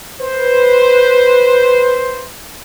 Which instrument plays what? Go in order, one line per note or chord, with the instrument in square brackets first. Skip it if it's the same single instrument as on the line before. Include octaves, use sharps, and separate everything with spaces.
[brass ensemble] B4 C5